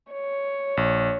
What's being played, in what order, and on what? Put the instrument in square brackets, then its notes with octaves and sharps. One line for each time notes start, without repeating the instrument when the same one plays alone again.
[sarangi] C#5
[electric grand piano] A#1